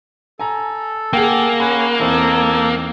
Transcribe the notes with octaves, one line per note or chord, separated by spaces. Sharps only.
A4 G#5 A#5
A#3 G#4 F#5 G5
C#4 F#5 G#5 B5
E2 C4 D#4 A4